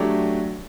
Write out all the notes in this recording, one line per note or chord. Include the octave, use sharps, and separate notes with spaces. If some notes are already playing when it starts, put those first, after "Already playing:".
Already playing: F#3 A3 D4 G4